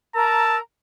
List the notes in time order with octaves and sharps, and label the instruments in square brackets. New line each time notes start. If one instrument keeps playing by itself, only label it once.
[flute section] A#4 A#5 E6 [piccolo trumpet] A5